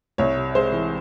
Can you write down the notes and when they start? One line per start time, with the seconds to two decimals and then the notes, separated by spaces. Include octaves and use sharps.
0.18 C2 C#5
0.36 C3
0.55 G#3 C5
0.73 E3